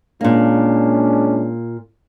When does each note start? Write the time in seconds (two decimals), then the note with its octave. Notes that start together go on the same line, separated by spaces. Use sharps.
0.21 A#2 G#3 A#3 C#4 D4